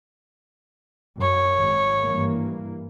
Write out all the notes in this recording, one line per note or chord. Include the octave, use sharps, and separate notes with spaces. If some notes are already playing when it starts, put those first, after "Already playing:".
F#2 C#5
G#1
G2 E3 A#3